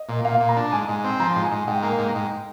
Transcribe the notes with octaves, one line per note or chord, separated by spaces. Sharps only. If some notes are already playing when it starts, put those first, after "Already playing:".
Already playing: D#5
A#2
A#2 F5
A#2
A#5
D4
G#2 G#5
G#2
C4
F3 A#5
G#2
G#5
G#2
G#2 G5
A#3
G#2
G#2